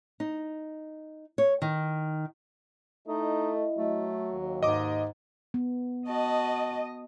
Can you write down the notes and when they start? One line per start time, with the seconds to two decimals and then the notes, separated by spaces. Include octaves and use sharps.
0.20 D#4
1.38 C#5
1.62 D#3
3.08 A3 D#4 E4 D#5
3.78 F#3 A3
4.31 D#2
4.63 G#2 D#5 D6
5.54 B3
6.08 F#4 D#5 A5